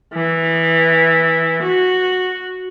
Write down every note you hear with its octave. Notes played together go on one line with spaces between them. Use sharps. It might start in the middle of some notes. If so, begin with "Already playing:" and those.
E3
F#4